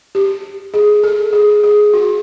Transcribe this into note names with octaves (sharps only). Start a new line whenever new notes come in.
G4
G#4
A4
G#4
G#4
F#4